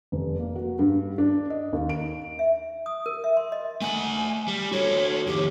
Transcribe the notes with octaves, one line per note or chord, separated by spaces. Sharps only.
F1
A#3
F#4
G2
D4
D#5
D#2
D7
E5
D#6
A#4
E5
C6
D#5
A3 F#5 G#5
G3
F#4 A4 C#5
F2 D#3 G4